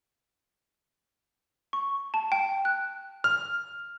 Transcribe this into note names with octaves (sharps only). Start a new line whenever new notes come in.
C#6
A5
G5
F#6
F6